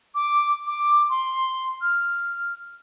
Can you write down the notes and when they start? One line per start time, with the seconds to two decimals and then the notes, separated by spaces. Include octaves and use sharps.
0.15 D6
0.66 D6
1.10 C6
1.81 F6